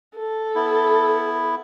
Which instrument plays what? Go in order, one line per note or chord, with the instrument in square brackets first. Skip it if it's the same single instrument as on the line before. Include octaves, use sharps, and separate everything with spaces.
[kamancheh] A4
[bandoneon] B3 E4